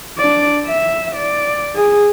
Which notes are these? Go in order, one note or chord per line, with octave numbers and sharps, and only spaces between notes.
D4 D5
E5
D5
G#4